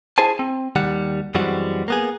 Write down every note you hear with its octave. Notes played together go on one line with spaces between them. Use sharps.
E4 G#4 C5 G#5 A5
C4
D#2 D#3 G3 F#5
F#2 E3 G3 G#3 C4 F#4
A#3 B3 G#4